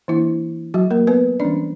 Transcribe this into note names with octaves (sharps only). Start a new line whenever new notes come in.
E3 A#3 D4 E4
F#3 F#4
A#3 A#4
B3 B4
E3 G3 C#4 D4 D5